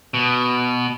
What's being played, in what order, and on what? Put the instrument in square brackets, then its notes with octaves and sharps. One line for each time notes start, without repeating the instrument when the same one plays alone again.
[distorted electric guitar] B2